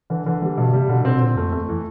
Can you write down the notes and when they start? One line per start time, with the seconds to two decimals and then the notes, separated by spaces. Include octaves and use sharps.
0.10 D3 E3
0.26 D3 E3
0.42 E3 G3
0.58 G2 B2
0.73 C3 G3
0.89 B2 D3
1.05 B2 C4
1.16 B2
1.21 A#2 C4
1.36 F2 A3
1.52 E2 A3
1.61 F2
1.69 E3